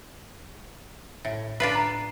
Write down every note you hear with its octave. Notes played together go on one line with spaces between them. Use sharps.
A2
D4 F4 B4 C7
A#5